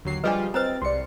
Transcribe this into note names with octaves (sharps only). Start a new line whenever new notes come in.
D#2 D3 F#3 C7
F3 G3 D4 F4 G#4 B4 D#5
C4 B4 C5 A#5 A6
C2 D5 C6 C#7